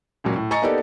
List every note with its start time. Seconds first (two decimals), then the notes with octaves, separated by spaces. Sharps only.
0.24 C#2 A#2 F#3
0.36 A2
0.51 D#5 G#5 A#5 C#6 A6 C#7
0.62 A#3 B3 D#4 G4 A4 D5